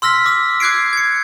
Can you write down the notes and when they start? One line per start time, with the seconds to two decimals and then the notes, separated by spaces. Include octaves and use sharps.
0.02 C6 E6 F6 A#6 B6
0.26 D6 E6
0.60 D6 F#6 G#6 C7 D7
0.93 G#6 C#7